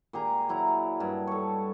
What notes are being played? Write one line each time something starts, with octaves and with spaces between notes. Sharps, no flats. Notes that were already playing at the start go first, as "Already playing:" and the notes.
A#2 G4 G#4 A#5
F#3 E4 A#5
G2
A4 C#5